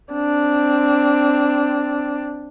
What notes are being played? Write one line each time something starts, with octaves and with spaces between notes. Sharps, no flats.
C4 D4